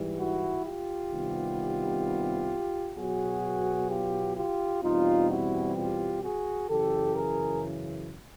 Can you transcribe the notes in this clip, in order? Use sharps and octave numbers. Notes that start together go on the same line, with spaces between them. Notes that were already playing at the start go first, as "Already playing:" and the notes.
Already playing: G#2 E3 G3
E4 F#4
F4 G4
C2 C3 D#3 G3 B3
B2 F#3 B3 F#4 G#4
F4 G4
F4 G4
E2 B2 G3 C4 D#4 F4
E4 F#4
F4 G4
F#4 G#4
F#2 C#3 E3 G4 A4
G#4 A#4